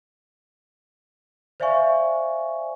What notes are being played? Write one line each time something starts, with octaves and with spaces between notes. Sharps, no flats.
C5 D5 E5 F5 G#5 C#6